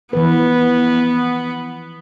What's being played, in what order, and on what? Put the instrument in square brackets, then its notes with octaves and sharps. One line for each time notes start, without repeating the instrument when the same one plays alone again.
[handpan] E3 F3 B4 [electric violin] B3